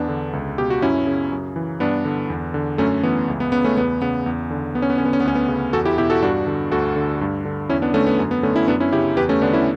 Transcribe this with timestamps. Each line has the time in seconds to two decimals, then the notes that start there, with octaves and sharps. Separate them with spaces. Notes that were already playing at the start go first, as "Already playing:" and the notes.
Already playing: E2 B3 D4
0.08 D3
0.33 C#2
0.58 B2 G4
0.70 F#4
0.82 F#2 C#4 E4
1.07 C#3
1.32 F#2
1.56 E3
1.80 G2 B3 D4
2.05 D3
2.30 E2
2.54 D3
2.78 F#2 A3 C#4
3.03 E3 B3
3.28 C#2
3.40 B3
3.52 C#3 B3
3.64 A3 C#4
3.77 E2 B3
4.02 C#3 B3
4.26 E2
4.51 D3
4.75 E2 B3
4.82 C#4
4.90 B3
4.98 D3 C#4
5.05 B3
5.13 C#4
5.20 B3
5.24 D2 C#4
5.35 B3
5.49 C#3
5.73 E2 F#4 A4
5.85 E4 G4
5.98 B2 E4 G4
6.10 F#4 A4
6.22 G2 D4 F#4
6.47 D3
6.72 D2 F#4 A4
6.96 D3
7.21 G2
7.45 D3
7.69 E2 C#4 E4
7.82 B3 D4
7.94 D3 A3 C#4
8.07 B3
8.19 F#2
8.31 B3
8.43 D3 A3 C#4
8.56 C#4 E4
8.68 F#2 B3 D4
8.80 C#4 E4
8.92 C#3 E4 G4
9.17 E2 G4 B4
9.29 A3 C#4
9.41 D3 B3 D4
9.53 C#4 E4